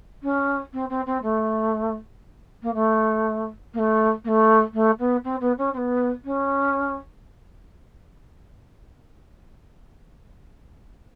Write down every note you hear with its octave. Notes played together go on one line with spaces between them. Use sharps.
C#4
C4
C4
C4
A3
A#3
A3
A#3
A3
A#3
A3
A3
B3
C4
B3
C#4
C4
B3
C#4